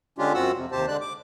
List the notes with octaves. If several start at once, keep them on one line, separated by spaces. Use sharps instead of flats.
D3 G#3 C#4 D4 F4 G4
F#2 C4 F4 F#4 F#5 E6
F2 C3
D#2 C3 G4 C5 A5
D3 G#3 D4 D5 F#6
D6